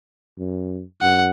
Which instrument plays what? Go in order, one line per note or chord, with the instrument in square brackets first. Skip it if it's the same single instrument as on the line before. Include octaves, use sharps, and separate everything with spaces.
[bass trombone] F#2
[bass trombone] F#2 [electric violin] F#5